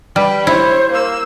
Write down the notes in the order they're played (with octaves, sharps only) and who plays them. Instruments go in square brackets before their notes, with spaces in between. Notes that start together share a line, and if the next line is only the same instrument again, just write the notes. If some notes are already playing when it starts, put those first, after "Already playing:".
[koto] G3 [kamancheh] B4 G5
[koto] E4 [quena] C5 [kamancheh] C#5
[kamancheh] A#3 E6